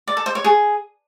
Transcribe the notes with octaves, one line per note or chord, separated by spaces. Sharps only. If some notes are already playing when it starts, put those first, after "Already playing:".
D5
A4
C5
C#5
G#4